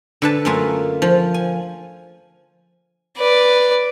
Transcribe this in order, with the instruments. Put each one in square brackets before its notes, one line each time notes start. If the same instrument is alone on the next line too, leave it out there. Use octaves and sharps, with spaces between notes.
[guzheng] D3 B4 A5
F#2 A3 A#3 F4 E5 G#5
F3 F4
G#5
[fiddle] B4 D5